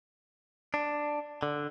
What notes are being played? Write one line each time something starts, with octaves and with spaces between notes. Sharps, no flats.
D4
D3